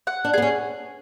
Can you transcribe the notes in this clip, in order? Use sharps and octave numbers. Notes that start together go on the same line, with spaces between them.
F#5
D4
B3 G#4
C#4